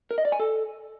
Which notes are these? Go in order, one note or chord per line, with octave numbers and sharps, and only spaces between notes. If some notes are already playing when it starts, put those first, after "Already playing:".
A#4
D#5
D5
G#5
A4